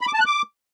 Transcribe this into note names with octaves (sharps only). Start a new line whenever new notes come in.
B5
D6
A5
F#6
D6